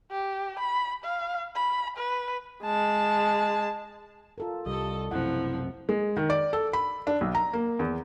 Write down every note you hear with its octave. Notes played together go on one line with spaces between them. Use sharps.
G4
B5
F5
B5
B4
G#3 A5
F4 A4 A#4
C2 G3 A4 D#5
B1 F#2 C3 F3 E4 F#5
G#3
D#3
D5
A4
B5
D4
B1
A#5
A#3
E2